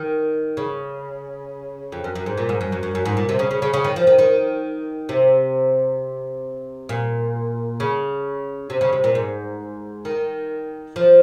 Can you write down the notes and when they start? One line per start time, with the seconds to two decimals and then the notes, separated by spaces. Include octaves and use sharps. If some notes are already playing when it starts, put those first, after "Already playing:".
Already playing: D#3
0.57 C#3
1.92 F2
2.04 F#2
2.15 F#2
2.26 G#2
2.37 A#2
2.49 G#2
2.61 F#2
2.72 F#2
2.83 F#2
2.95 F#2
3.06 G#2
3.17 A#2
3.29 C3
3.39 C#3
3.51 C#3
3.62 C#3
3.74 C#3
3.84 D#3
3.96 F3
4.07 D#3
4.19 D#3
5.09 C3
6.89 A#2
7.80 C#3
8.70 C3
8.81 C#3
8.93 C3
9.04 A#2
9.15 G#2
10.05 D#3
10.96 F3